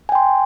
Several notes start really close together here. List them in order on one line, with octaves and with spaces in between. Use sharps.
G#5 G5 C6